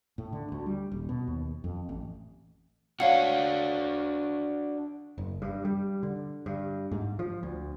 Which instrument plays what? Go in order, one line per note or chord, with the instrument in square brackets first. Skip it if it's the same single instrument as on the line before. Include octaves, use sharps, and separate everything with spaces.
[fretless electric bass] A2
D3
D2
G3
D#1
B2
D#2
F2
A1
[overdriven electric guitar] D4 F#4 [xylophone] C#5 F5 F#5
[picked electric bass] F#1
G2
G3
D3
G2
G#2
F3
D2